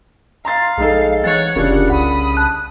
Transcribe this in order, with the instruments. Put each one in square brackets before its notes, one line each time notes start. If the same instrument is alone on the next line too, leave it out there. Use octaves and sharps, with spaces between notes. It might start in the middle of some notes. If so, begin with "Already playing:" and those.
[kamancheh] F5 [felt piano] A#5 C6 A6
[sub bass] A#1 [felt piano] G#3 D#4 A4
[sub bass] E3 [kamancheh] C#5 F#5 [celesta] A6
[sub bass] F1 [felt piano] C#3 D4 [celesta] F4 G4 A#4 [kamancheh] F#5
[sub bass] C2 [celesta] F#5 [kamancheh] B5 D#6
[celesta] A5 F#6